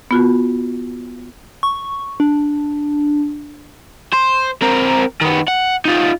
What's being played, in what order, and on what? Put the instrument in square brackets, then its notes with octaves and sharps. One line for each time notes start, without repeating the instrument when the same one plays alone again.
[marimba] B3 F4 F#4
[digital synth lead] C#6
D4
[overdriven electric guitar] C5
C4 A#4
D#3 B3
F#5
D#4 F4